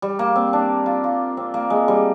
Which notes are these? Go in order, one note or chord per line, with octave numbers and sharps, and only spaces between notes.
G3
A#3
C4
D4
F4
F4
C4
A#3
G#3
G3